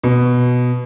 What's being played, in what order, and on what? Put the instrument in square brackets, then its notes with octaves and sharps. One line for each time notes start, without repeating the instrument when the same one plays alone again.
[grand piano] B2